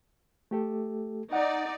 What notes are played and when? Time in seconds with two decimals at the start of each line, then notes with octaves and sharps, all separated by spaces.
0.51 A3 G4 A4
1.33 D#4 D5 F#5